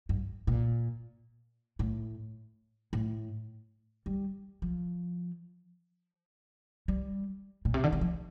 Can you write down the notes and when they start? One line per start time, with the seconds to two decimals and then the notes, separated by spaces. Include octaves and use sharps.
0.09 G2
0.47 A#2
1.79 A2
2.93 A2
4.06 G3
4.62 F3
6.88 G3
7.65 A#2
7.74 C3
7.84 D3
7.92 D#3
8.01 F3